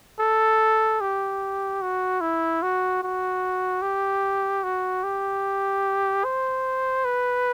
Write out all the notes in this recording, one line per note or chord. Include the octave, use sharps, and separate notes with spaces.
A4
G4
F#4
E4
F#4
F#4
G4
F#4
G4
C5
B4